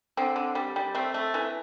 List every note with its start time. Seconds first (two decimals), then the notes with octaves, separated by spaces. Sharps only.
0.17 D3 C4
0.36 D3
0.55 G3
0.76 G3
0.95 A3 C4
1.14 A3
1.34 E3